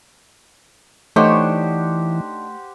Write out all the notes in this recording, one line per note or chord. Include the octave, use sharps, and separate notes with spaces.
E3 A3 D4 D#4 G4 C5 C#5 F#5